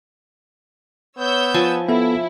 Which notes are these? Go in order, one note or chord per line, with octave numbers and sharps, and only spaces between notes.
B3 C#5 E6 G6
F3 G#5 A5
B3 E4 A4 E5